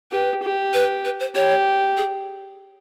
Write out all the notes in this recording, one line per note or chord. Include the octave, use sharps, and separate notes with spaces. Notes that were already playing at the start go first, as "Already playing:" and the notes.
G4 B4
G4
B4
B4
C5
G4 C#5
G#4